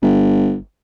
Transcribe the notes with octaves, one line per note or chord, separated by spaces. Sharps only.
G1